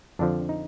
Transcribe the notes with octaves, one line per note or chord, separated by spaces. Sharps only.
F2 D3 F3 D4
D#4